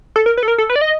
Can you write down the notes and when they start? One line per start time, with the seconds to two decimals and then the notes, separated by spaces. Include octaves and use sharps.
0.16 A4
0.26 A#4
0.37 B4
0.43 A4
0.48 A#4
0.58 A4
0.70 B4
0.76 D5
0.81 D#5